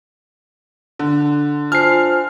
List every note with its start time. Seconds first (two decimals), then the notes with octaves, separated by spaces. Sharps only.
0.99 D3
1.72 F4 C5 G#5 A5 F6 C7